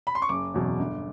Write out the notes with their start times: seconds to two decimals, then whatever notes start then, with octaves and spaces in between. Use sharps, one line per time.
0.07 B5
0.15 C6
0.22 C#6
0.29 F#1 D6
0.54 E2 B2 F#3
0.79 G1